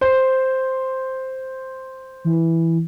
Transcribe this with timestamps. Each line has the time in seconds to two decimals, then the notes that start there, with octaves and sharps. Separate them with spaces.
0.01 C5
2.25 E3